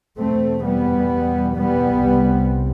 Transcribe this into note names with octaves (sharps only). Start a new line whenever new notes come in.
E2 B2 A3 C4
G3 B3
G3 B3
C2 C3